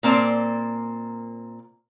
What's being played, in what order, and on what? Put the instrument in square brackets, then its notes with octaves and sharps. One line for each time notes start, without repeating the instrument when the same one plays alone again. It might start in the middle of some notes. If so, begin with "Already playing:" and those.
[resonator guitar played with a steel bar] A#2 A#3 C4 D5 A5